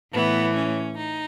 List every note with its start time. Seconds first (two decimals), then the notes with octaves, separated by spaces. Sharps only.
0.12 A2 E3 B3
0.55 C#4
0.97 D#4